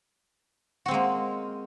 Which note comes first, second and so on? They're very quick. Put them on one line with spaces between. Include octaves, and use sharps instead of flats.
F#4 C4 G#3 A#3